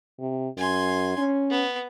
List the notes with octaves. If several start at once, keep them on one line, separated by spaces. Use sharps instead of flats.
C3
F#2 G#5 C6
C#4
B3